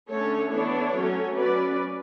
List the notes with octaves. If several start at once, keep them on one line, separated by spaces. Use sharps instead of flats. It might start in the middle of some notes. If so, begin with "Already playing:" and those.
D3 A3 C#4 A4 C#5
E3 B3 D4 A4 C#5
F#3 A3 C#4
F#3 C#4 B4 D5